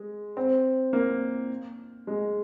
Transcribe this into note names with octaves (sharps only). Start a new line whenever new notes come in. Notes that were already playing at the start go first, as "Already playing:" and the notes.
Already playing: G#3
C4
A#3
G#3